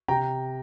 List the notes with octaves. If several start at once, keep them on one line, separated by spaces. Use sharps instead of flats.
C3 G5 A#5